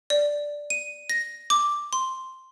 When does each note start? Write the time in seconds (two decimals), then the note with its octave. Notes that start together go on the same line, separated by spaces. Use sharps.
0.10 D5
0.70 D#7
1.10 A#6
1.50 D6
1.93 C6